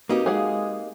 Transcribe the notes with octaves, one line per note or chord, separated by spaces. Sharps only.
A#3 C4 D#4 F#4 G4 B4
G#3 G#4 F5 F#5